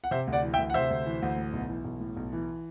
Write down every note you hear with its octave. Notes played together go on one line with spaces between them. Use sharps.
F#5
C3 C5 E5
D2
D5 F#5
E3
E5 G5
D2
F#5
C3 C5 E5
D2
E3
D2
A2
B1
E3
B1
A2
B1
E3